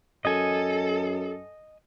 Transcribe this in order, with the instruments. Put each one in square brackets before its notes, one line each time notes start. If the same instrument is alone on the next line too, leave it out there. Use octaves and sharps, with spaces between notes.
[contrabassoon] F#2 [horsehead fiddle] A4 [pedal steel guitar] D#5 G#5